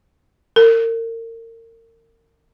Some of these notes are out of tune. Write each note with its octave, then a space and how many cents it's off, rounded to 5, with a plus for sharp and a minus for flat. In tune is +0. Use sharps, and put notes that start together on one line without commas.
A#4 -35